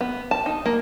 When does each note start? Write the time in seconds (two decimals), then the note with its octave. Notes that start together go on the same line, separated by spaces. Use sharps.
0.01 B3
0.31 A5
0.46 D#4
0.66 A#3